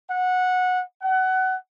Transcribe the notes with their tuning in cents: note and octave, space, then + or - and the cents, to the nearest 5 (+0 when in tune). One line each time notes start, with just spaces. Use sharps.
F#5 -15
F#5 +25